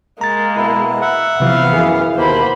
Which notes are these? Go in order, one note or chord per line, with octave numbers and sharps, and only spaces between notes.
G#3 A#3 A#5 A6
B2 E4
E5 F#5
C3 E3 F3 B3 F5
F#2 E3 E4 G#4
D#2 B2 A#3 C5 B5